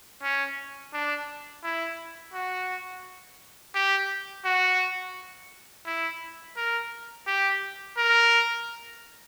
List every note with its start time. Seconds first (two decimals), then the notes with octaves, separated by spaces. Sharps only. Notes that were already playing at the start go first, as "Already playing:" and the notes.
0.23 C#4
0.93 D4
1.64 E4
2.34 F#4
3.75 G4
4.45 F#4
5.86 E4
6.57 A#4
7.27 G4
7.98 A#4